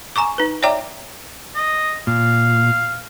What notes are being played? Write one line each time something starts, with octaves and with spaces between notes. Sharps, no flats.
G#5 A#5 C#6 D6
D#4 B4
C#5 D5 E5 G5 A#5 D6
D#5
A#2 F5